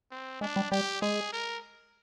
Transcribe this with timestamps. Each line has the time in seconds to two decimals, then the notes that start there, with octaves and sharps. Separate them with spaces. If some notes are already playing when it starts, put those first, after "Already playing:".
0.11 C4
0.41 G#3 D4
0.56 G3
0.71 G3 G4
1.02 G#3 G#4
1.33 A#4